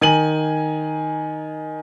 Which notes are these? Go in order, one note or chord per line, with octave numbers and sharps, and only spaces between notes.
D#3 G#5 D#7 F#7